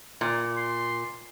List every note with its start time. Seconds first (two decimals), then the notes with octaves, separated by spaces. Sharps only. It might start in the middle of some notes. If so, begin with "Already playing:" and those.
0.21 A#2
0.57 C6